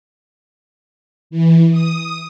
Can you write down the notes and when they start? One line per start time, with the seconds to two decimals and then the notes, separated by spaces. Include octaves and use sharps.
1.30 E3
1.71 D#6